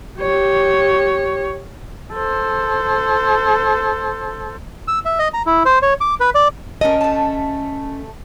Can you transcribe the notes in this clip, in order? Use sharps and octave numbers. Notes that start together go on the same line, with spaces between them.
G4 C#5
A4 C5
E6
E5
D#5
A#5
E4
C5
C#5
D6
B4
D5
A3 C#4 A4 A#4 D#5
A3 A5